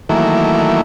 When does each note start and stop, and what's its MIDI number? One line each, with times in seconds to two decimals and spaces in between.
0.09 0.81 51
0.09 0.81 52
0.09 0.81 54
0.09 0.81 57
0.09 0.81 58
0.09 0.81 64